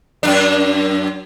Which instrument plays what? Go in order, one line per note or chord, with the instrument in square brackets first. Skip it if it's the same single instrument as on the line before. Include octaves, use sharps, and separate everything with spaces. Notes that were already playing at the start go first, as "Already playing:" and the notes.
[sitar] F#2 D4